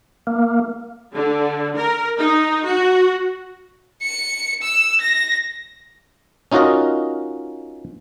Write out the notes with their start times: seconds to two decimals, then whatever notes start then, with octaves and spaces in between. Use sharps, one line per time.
0.27 A#3
1.15 D3
1.77 A#4
2.18 D#4
2.66 F#4
4.03 C#7
4.63 E6
5.01 A#6
6.52 C#4 D#4 F4 F#4 A#4 D#5